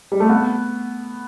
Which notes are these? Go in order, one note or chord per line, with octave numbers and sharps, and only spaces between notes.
G3
A3
B3